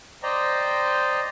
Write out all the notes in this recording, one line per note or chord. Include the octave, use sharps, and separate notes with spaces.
C5 D5 D#5 G5 A#5